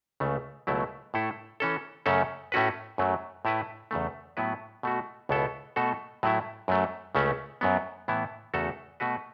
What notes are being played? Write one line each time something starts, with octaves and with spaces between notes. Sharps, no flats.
C#2 C#3 A3
C#2 B2 F#3 A3 E4
A2 A3 E4 A4
E3 C#4 A4
F#2 C#3 A3 C#4 A4
A2 A3 C#4 F#4 B4
F#2 F#3 A3
A2 A3 E4 B4
E2 C#3 A3
A2 F#3 B3 E4 B4
B2 A3 F#4
C#2 B2 B3 E4 A4
B2 A3 F#4 A4
A2 F#3 A3 E4
F#2 F#3 A3
C#2 C#3 A3 C#4
F#2 F#3 B3
A2 E3 B3 E4
E2 C#3 A3 F#4 A4
B2 A3 F#4 B4